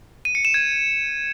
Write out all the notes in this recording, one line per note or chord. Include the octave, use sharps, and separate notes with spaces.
D#7
C#7
E7
G#6